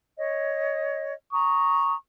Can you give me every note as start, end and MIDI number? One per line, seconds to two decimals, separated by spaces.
0.17 1.14 73
0.17 1.14 75
1.33 1.94 82
1.33 1.96 85
1.33 1.94 87